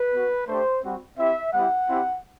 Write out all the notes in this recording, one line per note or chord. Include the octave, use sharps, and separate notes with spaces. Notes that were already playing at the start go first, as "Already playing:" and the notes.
Already playing: B4
B3 F#4
A3 D4 G4 C5
G3 C4 F#4
C4 E4 G4 E5
G3 B3 E4 G4 F#5
C4 E4 G4